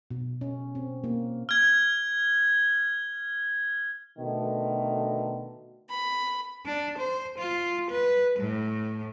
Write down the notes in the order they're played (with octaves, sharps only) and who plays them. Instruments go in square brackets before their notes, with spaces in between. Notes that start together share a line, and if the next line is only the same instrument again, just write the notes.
[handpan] B2
C#4
C4
A#3
[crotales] F6 G#6
[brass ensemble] B2 D3 D#3 A3
[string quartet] B5
[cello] D4
C5
F4
B4
A2